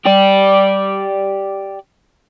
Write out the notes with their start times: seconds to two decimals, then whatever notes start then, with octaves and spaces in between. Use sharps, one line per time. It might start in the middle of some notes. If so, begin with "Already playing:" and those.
0.05 G4 D5